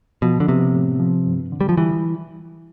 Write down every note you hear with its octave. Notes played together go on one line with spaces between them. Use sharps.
B2 F3
D3
C3 B3
A2
F3
G2
D3
G3
F3
E3 G3